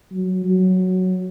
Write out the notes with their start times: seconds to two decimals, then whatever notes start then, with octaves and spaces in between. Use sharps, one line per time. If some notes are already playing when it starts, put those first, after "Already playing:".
0.11 F#3
0.45 F#3